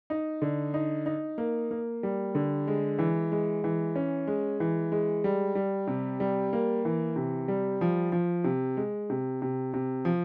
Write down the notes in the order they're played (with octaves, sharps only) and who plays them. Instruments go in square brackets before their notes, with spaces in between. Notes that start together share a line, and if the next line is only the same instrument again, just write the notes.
[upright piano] D#4
D3
D#4
D#4
A#3
A#3
G3
D3
G#3
E3
G#3
E3
C#4
G#3
E3
G#3
G3
G3
C3
G3
A#3
E3
C3
G3
F3
F3
C3
G#3
C3
C3
C3
F3